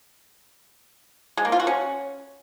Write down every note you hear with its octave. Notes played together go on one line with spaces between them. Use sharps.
G#3
A#3
F4
F#4
C#4